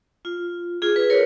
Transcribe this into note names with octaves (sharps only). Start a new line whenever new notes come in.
F4
F4 G#4
G#4 B4
A#4 C#5